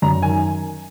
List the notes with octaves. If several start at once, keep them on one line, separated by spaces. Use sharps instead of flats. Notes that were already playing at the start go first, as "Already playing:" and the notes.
F#2 A#5
D#3 G#5